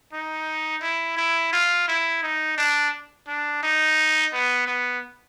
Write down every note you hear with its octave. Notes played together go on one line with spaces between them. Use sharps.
D#4
E4
E4
F4
E4
D#4
D4
D4
D#4
B3
B3